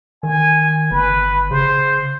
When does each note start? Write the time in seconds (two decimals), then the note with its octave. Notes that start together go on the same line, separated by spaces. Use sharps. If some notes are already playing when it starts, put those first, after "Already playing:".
0.23 D#3 G#5
0.91 G1 B4
1.51 C#3 C5